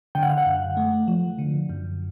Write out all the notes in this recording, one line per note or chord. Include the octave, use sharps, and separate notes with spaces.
D3 G5
F#5
F5
F#5
F#2
A3
F3
D3
F#2